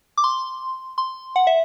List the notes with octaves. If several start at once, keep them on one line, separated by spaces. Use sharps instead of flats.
D6
C6
C6
F#5
E5